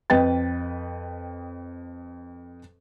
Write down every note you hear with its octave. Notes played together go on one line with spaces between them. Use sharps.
F2 B4 D#5 G5 A6